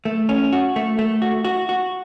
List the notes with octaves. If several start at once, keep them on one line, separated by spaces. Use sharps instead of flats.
A3
C#4
F#4
A3
A3
F#4
F#4
F#4